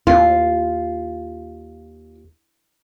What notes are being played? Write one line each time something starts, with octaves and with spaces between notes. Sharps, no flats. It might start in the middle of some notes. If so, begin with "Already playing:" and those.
D#2 F4